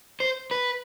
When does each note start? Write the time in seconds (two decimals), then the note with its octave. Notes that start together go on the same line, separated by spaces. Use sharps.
0.20 C5
0.51 B4